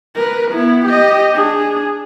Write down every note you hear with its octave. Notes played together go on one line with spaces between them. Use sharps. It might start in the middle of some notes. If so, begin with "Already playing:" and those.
A#4 B4
B3 E4
G4 D#5
D4 G#4